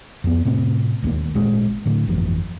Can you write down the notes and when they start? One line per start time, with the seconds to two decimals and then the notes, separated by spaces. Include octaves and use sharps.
0.24 F2 B3
0.45 A2 C3 C4
1.02 E1 D#2 D#3 A#3
1.35 G#1 A#2 G#3
1.86 A2 D3 A3
2.08 G1 F2 E3